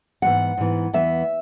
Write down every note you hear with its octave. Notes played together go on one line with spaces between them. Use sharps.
G#2 E3 B3 F#5
G#2 E3 B3
E2 E3 B3 E5